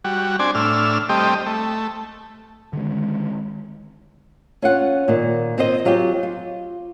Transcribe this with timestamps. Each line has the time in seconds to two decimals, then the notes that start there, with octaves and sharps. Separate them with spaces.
0.04 G3 F#4
0.39 C4 D4 D5 G#5
0.55 A2 D4 E6 F6
1.09 G3 A3 C4 G4 D#5
1.46 A3
2.73 D3 D#3 G#3
4.62 C#4 F4 F#5
5.08 A#2 D#3
5.58 C4 F4 C5 D#5
5.85 F#3 F4 G4 G#4
6.23 F4